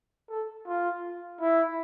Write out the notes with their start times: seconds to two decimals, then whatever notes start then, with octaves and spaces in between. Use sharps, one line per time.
0.30 A4
0.67 F4
1.41 E4